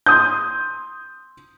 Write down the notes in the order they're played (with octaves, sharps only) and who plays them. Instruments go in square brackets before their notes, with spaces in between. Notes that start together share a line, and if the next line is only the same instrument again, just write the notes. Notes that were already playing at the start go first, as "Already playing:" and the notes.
[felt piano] C6 D#6 G6